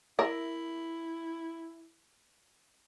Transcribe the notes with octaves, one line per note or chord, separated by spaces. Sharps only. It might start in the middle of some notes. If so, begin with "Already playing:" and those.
E4 A#4 E5